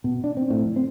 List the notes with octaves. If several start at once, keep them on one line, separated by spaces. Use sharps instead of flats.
B2
D4
C4
A2
F1
C4